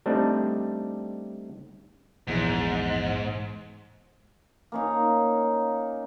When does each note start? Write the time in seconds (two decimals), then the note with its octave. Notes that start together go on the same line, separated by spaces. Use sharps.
0.06 G3 A3 C4 D4 D#4
2.27 A#1 E2 G#2
4.72 A#3 C#4 D#4